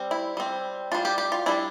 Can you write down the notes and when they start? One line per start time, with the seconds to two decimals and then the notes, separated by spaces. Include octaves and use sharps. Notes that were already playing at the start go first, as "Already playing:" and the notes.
Already playing: G3 C4
0.11 E4
0.37 G3 C4
0.92 G3 D4 F4
1.05 G4
1.18 G4
1.32 F4
1.46 G3 D4 E4